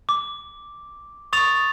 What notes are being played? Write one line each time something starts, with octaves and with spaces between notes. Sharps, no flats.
D6
C#6 D#6 A6 F7